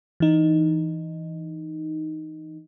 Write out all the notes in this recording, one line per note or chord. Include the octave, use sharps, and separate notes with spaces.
E3 D#4